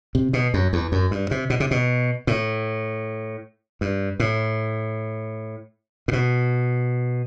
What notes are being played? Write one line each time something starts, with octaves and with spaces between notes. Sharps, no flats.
C3
B2
F#2
E2
F#2
G2
C3
B2
C3
B2
A2
G2
A2
A2
B2